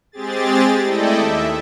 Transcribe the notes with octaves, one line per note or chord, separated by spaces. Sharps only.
G#3 C4 G4 G#4 A6
A3 E4 A4 D5 D#5 G5
D#2 E5